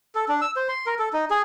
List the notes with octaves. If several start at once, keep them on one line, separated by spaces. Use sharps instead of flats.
A4
D4
E6
C5
C6
A#4
A4
D#4
G#4